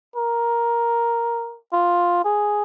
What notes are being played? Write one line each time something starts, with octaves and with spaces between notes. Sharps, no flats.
A#4
F4
G#4